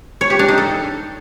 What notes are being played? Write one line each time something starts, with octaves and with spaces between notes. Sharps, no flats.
C#5
G4
D4
D#4
A4